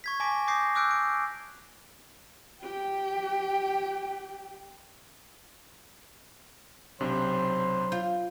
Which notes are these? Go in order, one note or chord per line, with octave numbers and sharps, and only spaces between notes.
C#6 G#6 B6
G#5 A5 D6 A#6 B6 D7
D6 D#6 G6 A#6 C7
D6 E6 F#6 G6 D7
F#6 D7
G4 G5
B1 C3 F#3 D4 C5 B5 C6
F4 G6